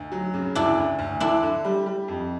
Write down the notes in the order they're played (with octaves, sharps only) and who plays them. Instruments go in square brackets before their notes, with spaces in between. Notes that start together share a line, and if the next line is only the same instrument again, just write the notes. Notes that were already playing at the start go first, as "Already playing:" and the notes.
Already playing: [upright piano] D2 [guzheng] D#4
[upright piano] F#3
C#3
[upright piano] D2 [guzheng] D4 E4
[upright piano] D2
D2
[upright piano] D3 [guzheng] D4 E4
[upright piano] D3
G3
G3
F2